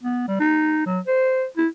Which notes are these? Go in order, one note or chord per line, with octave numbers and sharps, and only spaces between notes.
B3
G3
D#4
F#3
C5
E4